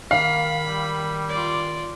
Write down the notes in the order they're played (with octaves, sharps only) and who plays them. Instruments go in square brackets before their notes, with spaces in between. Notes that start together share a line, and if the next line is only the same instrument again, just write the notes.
[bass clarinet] D#3 [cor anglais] A#3 [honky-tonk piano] F5 [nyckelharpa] B5
[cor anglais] G3
[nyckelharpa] F4 D5